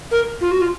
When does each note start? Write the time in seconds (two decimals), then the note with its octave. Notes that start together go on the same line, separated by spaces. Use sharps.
0.11 A#4
0.41 F4
0.51 F#4
0.61 F4